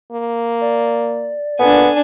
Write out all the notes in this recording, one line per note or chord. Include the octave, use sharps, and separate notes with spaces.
A#3
D5
A#2 B3 D4 A4 G#5